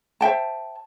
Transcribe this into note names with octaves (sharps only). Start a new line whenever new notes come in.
C5 E5 G5 A5